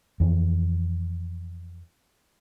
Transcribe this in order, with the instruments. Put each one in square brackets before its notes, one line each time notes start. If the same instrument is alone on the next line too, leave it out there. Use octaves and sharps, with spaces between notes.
[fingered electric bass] F2 E3